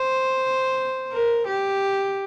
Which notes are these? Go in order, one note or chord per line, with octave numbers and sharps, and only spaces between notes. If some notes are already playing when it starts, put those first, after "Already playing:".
Already playing: C5
A#4
G4